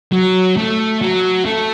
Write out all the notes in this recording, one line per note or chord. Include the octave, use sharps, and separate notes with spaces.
F#3
A3
F#3
A3